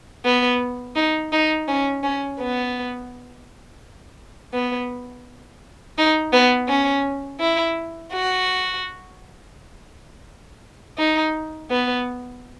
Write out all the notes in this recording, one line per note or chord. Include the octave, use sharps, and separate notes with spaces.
B3
D#4
D#4
C#4
C#4
B3
B3
D#4
B3
C#4
E4
F#4
D#4
B3